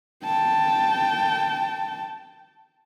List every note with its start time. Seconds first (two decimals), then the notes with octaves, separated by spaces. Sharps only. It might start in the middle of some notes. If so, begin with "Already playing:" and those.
0.24 G5 A5